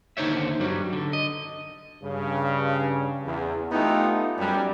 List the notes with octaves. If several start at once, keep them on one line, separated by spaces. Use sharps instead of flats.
D#2 D3 D#4 C5 C#5 E5
G2 F#3 G3
D3
D#5
G2 C#3
E2
A3 B3 D#4 F4 G4
F#2 G3